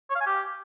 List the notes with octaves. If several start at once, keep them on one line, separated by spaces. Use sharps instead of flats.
C#5
F5
G#5
G4